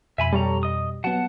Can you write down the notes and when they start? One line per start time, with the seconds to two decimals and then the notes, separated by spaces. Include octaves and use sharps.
0.18 F2 B2 E5 G#5 B5
0.33 G3 A4 C#5 A#5
0.63 D#5 D#6
1.04 F#3 B3 F#5 A5